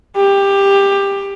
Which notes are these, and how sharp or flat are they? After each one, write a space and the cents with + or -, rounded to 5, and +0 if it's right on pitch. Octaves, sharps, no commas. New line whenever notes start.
G4 +15